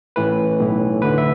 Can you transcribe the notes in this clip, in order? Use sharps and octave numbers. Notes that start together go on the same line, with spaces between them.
A1 A2 E3 B4
B1 A2 E3
D2 D3 B4
E5